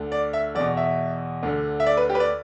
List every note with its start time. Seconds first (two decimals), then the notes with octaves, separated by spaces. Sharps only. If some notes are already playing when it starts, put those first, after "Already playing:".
Already playing: D2 D3
0.12 D5
0.33 E5
0.55 E2 D5
0.59 B2
0.77 E5
1.43 D2 D3
1.80 E5
1.86 D5
1.97 B4
2.09 G4
2.15 B4
2.20 D5